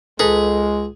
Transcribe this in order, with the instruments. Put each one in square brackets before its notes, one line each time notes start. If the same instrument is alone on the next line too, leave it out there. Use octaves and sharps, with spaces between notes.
[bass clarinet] C#2 [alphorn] G#3 [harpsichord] G#4 [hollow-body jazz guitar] A4 B4 A#5